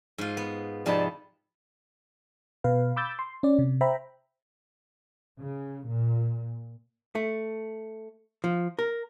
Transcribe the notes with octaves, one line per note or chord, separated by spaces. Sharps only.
G#2 F4
B3
G#2 C3 F3 D#4 D5 A5 B5
B2 B4 F5
B5 D6 E6 G6 A6
C6
C#4 D5
C3
C5 E5 G5 A#5 B5
C#3
A#2
A3
F3
A#4